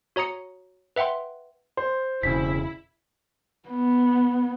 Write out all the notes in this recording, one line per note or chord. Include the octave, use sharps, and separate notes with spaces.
F#4 C#5 A#5 D#6 C#7
B4 E5 F#5 G5 C6
C5 C6
E1 C#3 E4 B6
B3